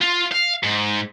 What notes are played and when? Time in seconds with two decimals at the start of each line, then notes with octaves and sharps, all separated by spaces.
0.02 F4
0.32 F5
0.63 G#2